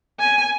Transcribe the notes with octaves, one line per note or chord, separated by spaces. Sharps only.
G#5